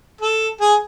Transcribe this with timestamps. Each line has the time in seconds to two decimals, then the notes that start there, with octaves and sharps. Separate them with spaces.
0.21 A4
0.61 G#4